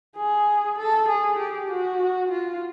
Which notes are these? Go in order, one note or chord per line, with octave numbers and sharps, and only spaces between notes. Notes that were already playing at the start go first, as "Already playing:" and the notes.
G#4
A4
G#4
G4
F#4
F4